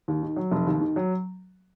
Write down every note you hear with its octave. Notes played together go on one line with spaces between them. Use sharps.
D#2
D#3
F#3
F1
D#2
D#3
F#3